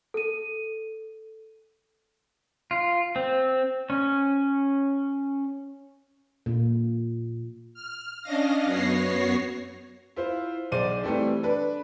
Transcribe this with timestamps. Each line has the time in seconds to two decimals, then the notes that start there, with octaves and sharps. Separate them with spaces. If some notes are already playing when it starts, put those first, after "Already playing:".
0.14 A4 D#7
2.71 F4
3.16 C4
3.90 C#4
6.46 A#2
7.74 F6
8.22 C#4 D4 D#5 F5 A#6
8.65 F#2 B3 F#4 C#5 A#6 C7
10.16 E4 F4 C5
10.72 B1 G#4 C5 D5 D#7
11.03 E3 G3 A3 C4 E4
11.43 D4 B4